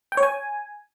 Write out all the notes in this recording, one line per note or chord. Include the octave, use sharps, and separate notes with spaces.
G5
C#5
G#5